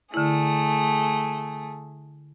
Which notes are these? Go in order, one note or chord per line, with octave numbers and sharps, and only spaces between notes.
D3 A3 E4 G#4